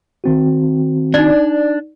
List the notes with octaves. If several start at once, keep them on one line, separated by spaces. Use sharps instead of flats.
D#3 C4 F#4
D4 D#4 D5